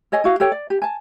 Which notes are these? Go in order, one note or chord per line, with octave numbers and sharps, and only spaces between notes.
A4 C#5 D#5 G#5
E4 F#4 F5
G4 A4 C#5 G5
D5
G4
G#5 A5